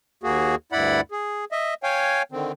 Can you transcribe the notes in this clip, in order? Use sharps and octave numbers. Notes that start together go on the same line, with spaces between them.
D#2 A#3 F#4 G#4
D2 G2 E4 D5 F#5 B5
G#4
D#5 E5
C#5 F5 G5 G#5
D3 D#3 C4